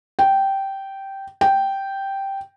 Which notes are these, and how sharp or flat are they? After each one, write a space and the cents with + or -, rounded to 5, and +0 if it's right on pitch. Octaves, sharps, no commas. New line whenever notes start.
G5 -10
G5 -5